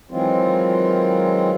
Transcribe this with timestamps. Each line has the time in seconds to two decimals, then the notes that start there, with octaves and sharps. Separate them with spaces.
0.11 D#3 E3 F#3 G#3 C4 F4